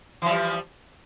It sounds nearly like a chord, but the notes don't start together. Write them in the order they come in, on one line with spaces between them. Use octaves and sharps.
E3 F3 G3